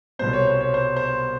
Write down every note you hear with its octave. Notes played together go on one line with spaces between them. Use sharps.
C2 B2 G3 B3 C5
C#5
C5
C#5
C5
C5